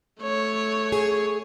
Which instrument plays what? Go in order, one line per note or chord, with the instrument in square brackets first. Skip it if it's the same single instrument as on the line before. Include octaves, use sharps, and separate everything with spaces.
[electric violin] A3 C#5
[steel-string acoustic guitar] G#4